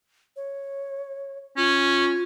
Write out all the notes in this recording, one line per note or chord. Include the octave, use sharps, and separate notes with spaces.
C#5
C#4 F4